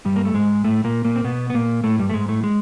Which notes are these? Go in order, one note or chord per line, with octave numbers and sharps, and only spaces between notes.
G2 G3
A#3
A3
G#2 G#3
A2 A3
A#2 A#3
A#2 A#3
C4
B2 B3
B3
A#2 A#3
A2 A3
G2 G3
A3
G#2 G#3
A2 A3
G#3